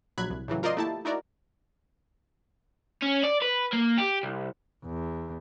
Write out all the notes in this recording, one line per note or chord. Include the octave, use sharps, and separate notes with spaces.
A#1 F#3 B5 F#6 G#6
C2
A2 C#3 E3 F#3
F4 A#4 C5 D5 D#5 C6
A3 A#3 E4 G4 A5
D#4 E4 F#4 A#4 D5
C#4
D5
B4
A#3
G4
C2
E2